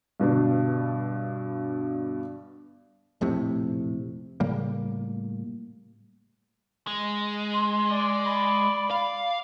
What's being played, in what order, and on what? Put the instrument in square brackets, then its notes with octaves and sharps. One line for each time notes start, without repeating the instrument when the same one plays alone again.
[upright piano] G2 B2 D3 D4
[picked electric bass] A#1 F2 A2 C3
A2 C#3 G3 A#3
[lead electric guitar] G#3
[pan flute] C6
[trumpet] D5
[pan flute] B5
[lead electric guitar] F5